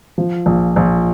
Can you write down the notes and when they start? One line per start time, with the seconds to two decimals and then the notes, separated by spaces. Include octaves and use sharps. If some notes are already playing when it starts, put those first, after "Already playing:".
0.18 F3
0.46 A#1
0.76 A#1